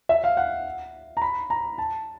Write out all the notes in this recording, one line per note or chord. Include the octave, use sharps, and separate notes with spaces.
E5
F5
F#5
A#5
B5
A#5
A5